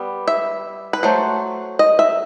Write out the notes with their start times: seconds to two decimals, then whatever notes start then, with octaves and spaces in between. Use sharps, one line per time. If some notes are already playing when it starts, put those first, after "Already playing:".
Already playing: G3 B3
0.28 E5
0.93 B4
1.03 F#3 A3 C5
1.79 D#5
1.99 E5